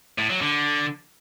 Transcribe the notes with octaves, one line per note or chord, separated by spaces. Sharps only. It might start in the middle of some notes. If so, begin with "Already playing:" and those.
A2
F#3
D3